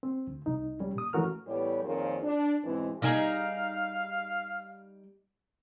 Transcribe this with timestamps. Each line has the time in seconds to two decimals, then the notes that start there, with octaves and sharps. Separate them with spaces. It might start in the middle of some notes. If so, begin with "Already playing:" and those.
0.03 C4
0.27 D2
0.46 C2 D#4
0.80 G3 C#4
0.95 A#2 D#6
1.13 E3 A3 C#4 F#4 A#4 F6
1.47 A2 E3 G3 B3 G4 C#5
1.83 F2 A#2 D#3 G#4 C5 C#5
2.23 D4
2.64 G#2 B2 E3 G#3 B3 C4
3.02 G3 D#4 G#4 F5